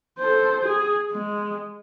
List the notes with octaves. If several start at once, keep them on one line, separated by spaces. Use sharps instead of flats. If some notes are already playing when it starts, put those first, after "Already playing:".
A4 C5
G#4
G#3